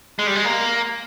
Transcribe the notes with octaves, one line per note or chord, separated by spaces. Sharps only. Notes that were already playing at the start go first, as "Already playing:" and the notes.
G#3
G3
G#3
A#3